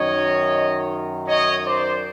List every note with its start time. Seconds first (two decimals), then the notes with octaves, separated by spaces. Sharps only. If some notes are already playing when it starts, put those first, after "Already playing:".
Already playing: F#2 D#3 C#5 D#5
1.28 C#5 D#5
1.66 C5 D5